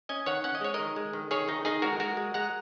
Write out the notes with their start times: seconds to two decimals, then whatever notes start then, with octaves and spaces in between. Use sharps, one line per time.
0.09 C#4 D#5 G#5
0.26 D#3 C#5 F#5
0.44 C#4 F#5
0.55 D#5
0.61 G#3 C#5
0.74 D#3 A#4 D#5
0.96 G#3
1.13 D#3
1.31 D#3 G#4 C#5
1.48 D#3 D#4
1.65 D#3 D#4 G#4
1.82 G#3 F#4 A#4
2.00 G#3 F#4 A#4
2.17 G#3
2.34 G#3 F#5 A#5